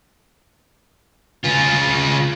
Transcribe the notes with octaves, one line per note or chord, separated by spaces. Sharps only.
C#3 F4